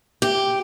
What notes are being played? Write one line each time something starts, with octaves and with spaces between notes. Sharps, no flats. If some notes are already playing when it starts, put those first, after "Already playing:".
G4